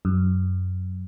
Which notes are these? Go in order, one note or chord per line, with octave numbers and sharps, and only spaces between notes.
F#2